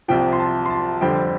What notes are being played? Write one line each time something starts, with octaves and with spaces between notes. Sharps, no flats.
C2 C3 F3 G5
C6
A5
C6
A5
F2 D3 G3 C4 G5